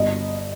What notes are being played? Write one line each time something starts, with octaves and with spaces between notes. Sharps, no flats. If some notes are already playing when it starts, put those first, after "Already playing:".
Already playing: G1 D#5